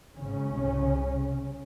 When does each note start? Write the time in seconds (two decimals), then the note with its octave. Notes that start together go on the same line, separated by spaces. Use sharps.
0.16 G#1 G#2 C#3 C#4
0.51 C2 C3